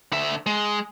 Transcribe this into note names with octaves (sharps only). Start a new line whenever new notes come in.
D3 E5
G#3